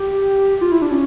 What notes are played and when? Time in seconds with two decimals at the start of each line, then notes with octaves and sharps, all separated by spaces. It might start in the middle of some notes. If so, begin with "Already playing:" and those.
Already playing: G4
0.61 F4
0.72 E4
0.82 D4
0.91 C#4